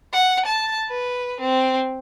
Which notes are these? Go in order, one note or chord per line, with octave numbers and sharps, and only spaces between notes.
F#5
A5
B4
C4